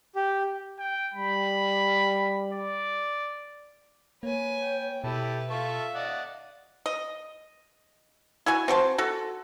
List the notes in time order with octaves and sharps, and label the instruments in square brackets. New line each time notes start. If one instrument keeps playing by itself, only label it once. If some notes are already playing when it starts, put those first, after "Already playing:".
[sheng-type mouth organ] G4
[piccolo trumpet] G5
[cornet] G3 [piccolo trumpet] B5
[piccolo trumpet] D5
[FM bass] A#3 [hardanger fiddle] B4 G#5 [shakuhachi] C#5
[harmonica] G5
[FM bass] B2 [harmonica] E4 G4 A4 [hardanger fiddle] B4
[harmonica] F4 A4 C#6 [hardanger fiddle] E5 [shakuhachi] F5
[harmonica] D5 D#5 F#5
[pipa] D#5
E4 F#4 G#5
C4 F#4 C5 A5
F#4 A4